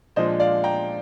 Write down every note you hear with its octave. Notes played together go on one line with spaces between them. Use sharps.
A#2 F3 G#3 D4 C5 D#5
D5 F5
G5 A#5